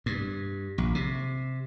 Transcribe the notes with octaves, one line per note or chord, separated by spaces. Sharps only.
G2
A#1
C3